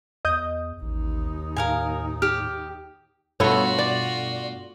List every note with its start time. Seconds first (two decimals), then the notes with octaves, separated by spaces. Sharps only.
0.25 E2 D#5 D#6 G6
0.82 A1 D#2 D#4
1.56 A2 A#4 F5 G#5
2.22 G4 F6
3.40 G2 B2 A3 B3 F4 F#4 A4 C#5
3.79 D5